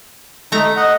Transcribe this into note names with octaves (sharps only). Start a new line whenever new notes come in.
A3 D#4 A#5
D#5 F#5